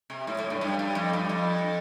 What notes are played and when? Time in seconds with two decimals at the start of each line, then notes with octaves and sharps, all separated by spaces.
0.10 C3
0.27 A2
0.38 A2
0.50 G2
0.61 G2
0.79 G2
0.95 F2
1.13 G2
1.29 F2